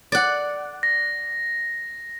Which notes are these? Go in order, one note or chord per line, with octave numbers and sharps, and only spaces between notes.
D5 F#5
A#6